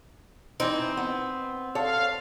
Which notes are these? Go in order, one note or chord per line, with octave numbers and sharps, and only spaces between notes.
E3 C4 D#4
B3
A4 C#5 F5